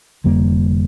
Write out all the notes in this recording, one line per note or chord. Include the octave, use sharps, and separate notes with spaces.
F1 F2 D3 G3 A#3